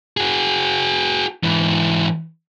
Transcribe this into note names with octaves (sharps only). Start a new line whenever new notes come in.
F#4 G#4
G#2 E3